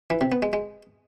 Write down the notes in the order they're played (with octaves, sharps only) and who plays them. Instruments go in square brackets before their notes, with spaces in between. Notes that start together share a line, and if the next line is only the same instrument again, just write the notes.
[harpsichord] E3
C3
B3
G#3
G#3